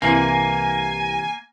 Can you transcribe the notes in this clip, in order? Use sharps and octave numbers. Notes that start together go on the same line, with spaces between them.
C2 C3 E3 A#3 G#5